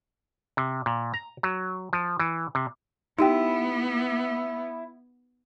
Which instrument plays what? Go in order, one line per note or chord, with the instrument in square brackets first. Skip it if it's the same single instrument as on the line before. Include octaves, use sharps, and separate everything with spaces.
[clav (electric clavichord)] C3
A#2
A#5
F#3
F3
E3
C3
[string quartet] B3 [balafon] D#4 G4 G5 [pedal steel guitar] E4